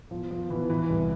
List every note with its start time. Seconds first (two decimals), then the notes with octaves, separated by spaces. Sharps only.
0.11 B2 F3
0.30 B2 F3
0.50 B2 E3
0.70 B2 E3
0.90 C2